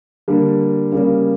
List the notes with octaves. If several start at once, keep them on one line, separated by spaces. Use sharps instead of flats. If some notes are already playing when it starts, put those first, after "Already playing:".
D3 G3 A#3
C#3 G3 A#3